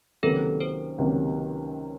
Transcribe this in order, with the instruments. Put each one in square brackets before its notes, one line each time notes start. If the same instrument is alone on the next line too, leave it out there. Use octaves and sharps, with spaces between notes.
[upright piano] C#2 C3 D#3 F#3 A#3 [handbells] A4 B4
[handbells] A#4 C5
[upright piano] C#2 C3 D#3 F#3 A#3